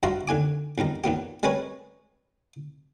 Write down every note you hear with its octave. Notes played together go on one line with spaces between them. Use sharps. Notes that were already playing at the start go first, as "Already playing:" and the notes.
G2 F3 F#4 E5 A#5 C6
D#2 D3 G#5 D6
E2 G2 D#3 A#5
D#2 A#2 B3 G4
G3 G#3 C#4 A#4 B4 C#5